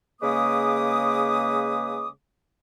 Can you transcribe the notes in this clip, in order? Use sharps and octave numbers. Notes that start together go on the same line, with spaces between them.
C#3 G#3 A#3 B4 D6 D#6